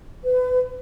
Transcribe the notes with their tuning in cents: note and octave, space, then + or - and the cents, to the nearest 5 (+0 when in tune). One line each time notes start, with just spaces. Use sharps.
B4 +30